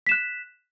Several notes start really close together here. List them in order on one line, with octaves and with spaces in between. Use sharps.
B6 E7 F#6